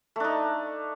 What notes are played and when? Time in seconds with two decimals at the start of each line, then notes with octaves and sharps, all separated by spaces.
0.16 A3
0.20 D4
0.24 D#4